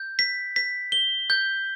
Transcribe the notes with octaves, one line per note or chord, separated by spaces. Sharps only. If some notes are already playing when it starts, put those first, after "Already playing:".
Already playing: G6
B6
B6
G7
G6